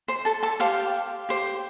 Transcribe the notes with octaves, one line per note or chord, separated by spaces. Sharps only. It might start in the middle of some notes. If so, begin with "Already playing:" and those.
C5 C6
A4 A5
A4 A5
G4 C5 F5
G4 C5